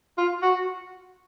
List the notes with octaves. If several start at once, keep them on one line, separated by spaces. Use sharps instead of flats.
F4
F#4